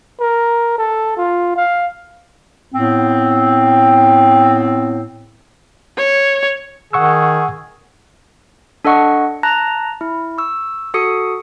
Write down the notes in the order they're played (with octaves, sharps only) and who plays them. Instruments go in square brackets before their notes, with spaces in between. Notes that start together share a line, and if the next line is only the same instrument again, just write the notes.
[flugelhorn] A#4
A4
F4
F5
[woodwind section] A2 B3 C4
[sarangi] C#5
[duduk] D#3 [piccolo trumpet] G#4 [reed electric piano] F#5 C#6 E6
[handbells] D4 A4 D#5 F#5 C#6 C#7
A5 A#5 F#6 A#6
E4
C#6 E6
F#4 A4 D#6 C#7